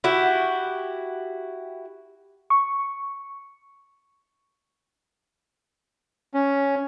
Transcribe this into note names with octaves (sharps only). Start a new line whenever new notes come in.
E4 F#4 G4
C#6
C#4